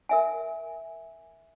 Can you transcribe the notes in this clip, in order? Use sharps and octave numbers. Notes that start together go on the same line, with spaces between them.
A#4 E5 G#5